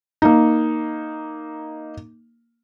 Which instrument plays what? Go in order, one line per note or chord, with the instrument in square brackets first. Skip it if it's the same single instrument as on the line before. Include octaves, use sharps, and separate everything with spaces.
[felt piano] A#3 D#4